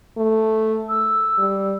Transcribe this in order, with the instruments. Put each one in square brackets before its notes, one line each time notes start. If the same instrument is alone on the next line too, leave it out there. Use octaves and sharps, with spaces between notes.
[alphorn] A3
[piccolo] E6
[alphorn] G3